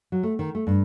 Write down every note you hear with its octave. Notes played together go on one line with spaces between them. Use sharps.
F#3
A3
D#3
A3
G2